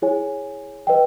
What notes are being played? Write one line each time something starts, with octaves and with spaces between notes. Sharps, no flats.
E4 G#4 C#5 G#5
B4 D#5 G5